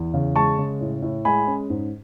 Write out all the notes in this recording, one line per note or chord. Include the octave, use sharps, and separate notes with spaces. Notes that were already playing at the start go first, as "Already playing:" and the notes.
Already playing: E2
C#3
G#3 A5 C#6
C#3
A2
A2
G#3 G#5 B5
C#4
G#2